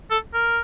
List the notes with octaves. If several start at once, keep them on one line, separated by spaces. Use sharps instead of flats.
A4
A#4